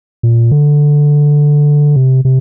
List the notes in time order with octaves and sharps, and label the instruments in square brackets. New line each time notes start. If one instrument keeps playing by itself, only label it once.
[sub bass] A#2
D3
C3
C3